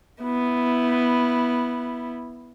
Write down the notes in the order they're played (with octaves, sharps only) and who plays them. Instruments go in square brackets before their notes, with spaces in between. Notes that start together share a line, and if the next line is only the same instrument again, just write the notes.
[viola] B3 E4